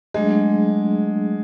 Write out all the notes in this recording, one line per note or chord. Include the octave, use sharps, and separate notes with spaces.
F#3 G#3 A3 D4 G#4